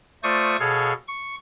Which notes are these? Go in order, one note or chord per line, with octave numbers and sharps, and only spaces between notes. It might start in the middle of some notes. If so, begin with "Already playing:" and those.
A3 F4 C5 D5 C#6 D#6
B2 G#4 A4 C#5 F5
C#6